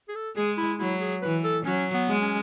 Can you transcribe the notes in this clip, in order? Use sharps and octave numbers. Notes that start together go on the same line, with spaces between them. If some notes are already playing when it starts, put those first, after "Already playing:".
G#4
A4
G#3 G#4
E4
F#3 E4
G#4
E3 B4
A4
F#3 C#4
B3
G#3
C#4